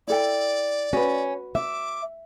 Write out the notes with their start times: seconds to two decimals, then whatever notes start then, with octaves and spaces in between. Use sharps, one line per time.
0.08 E4 A4 D5 G5
0.93 C#4 F#4 B4
1.55 E5 D6